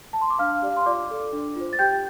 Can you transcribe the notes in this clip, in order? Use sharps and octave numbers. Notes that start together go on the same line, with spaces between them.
A5
C6
D6
D4 F5 F6
G4 D5
C6
F4 D5 D6
A4 D5
D4
F4 C5
A6
G4 G5 G6